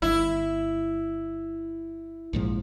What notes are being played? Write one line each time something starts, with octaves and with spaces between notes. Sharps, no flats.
G1 E4
A#1 G#2 F3